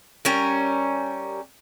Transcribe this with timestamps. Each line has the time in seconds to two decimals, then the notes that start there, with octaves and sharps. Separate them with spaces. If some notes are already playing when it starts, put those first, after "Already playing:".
0.25 G3 C#4 A#4